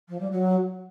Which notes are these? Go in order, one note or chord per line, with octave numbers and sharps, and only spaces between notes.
F3
G3
F#3